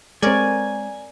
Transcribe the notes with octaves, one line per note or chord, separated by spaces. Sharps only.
G#3 C4 A#4 C#5 D5 G#5